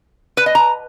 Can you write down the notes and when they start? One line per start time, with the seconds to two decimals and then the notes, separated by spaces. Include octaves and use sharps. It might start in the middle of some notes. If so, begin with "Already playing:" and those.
0.37 B4
0.46 D#5
0.55 A#5